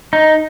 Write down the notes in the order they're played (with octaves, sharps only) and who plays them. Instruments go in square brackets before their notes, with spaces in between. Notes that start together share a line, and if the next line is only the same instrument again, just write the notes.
[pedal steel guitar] D#4